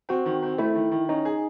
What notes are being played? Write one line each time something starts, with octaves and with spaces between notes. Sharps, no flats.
C4 F#4
D#3
C4
A3 E4
D#3
D#3
C#4 D#4
G#4